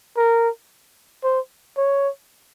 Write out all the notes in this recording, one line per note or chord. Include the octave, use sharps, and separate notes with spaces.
A#4
C5
C#5